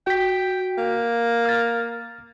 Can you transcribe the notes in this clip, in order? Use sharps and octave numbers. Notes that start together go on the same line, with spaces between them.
F#4 G5 B6
A#3
F6 A6